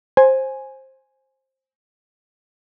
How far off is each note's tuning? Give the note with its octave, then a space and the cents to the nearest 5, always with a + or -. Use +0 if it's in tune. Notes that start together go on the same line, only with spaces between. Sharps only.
C5 +15 G#5 +0